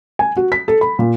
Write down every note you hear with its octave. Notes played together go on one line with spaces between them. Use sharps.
G#5
F#4
B6
A4
B5
A#2